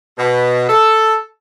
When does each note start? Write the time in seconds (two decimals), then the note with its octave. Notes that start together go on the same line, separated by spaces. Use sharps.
0.18 B2
0.69 A4